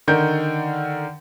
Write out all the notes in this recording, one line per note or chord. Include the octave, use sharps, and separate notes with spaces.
D3 D#3 A#4 G6